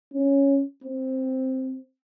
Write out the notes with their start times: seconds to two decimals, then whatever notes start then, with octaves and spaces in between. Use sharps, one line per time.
0.14 C#4
0.84 C4